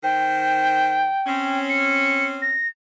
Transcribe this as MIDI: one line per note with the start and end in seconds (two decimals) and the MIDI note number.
0.04 1.12 51
0.04 1.12 72
0.04 1.59 79
1.27 2.57 60
1.27 2.57 61
1.69 2.26 97
2.42 2.68 94